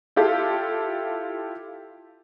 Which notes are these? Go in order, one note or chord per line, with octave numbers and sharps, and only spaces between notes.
E4 F4 G4 A4 F5